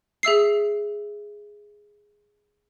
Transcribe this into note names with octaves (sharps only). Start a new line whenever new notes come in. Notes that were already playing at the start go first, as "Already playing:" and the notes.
G#4 E5 E6 C7